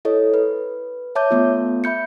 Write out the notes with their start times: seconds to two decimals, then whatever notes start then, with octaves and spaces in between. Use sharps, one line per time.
0.05 E4 A4 C#5 D#5
0.34 B4
1.15 C#5 E5 A5 D6 G6
1.31 A3 B3 F4
1.84 E5 B5 G6 C#7